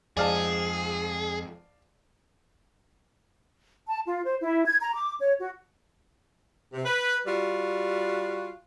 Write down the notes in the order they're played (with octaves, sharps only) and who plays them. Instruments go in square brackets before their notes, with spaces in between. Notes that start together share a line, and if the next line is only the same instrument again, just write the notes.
[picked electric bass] F2 [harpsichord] G#2 [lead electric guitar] G#4 [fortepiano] D5 F5 A5
[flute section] A5
F4
C5
E4
G#6
A#5
D6
C#5
F#4
[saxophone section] C3
B4
G3 F4 F#4